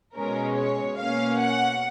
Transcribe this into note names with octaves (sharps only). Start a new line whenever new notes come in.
B2 G#3 C#4 A#4
C#5
B2 A#3 C#4 F5
F#5